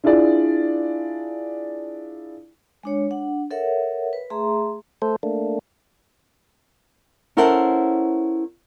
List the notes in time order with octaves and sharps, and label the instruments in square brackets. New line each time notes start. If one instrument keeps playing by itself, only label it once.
[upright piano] D4 E4 F4 G#4 D5
[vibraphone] G#3 D4 C#5
D4 F#5
A4 A#4 C#5 E5 F#5
B4
A3 G#4 E5 A#5 C6
[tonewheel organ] A3 A4 C5
A3 A#3 D4
[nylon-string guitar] C#4 E4 A4 A#4 C5 F#5